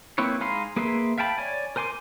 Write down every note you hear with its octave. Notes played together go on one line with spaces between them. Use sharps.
A#3 C4 E4 B4 C#5
G#3 D#4 F5 B5 C6
A#3 G#4 B4 E5 C6
E5 F5 G5 A5 B5
C#5 D5 G#5
A#4 C5 G#5 C6 D6